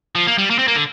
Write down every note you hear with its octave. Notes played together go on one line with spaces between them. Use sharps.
F3
A#3
G3
A#3
C4
A#3
D3